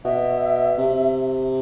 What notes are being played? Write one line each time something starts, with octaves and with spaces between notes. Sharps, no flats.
B2 E5
C3